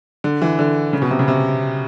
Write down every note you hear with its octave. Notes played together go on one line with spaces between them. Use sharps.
D3
E3
D3
C#3
B2
C3
C#3
C3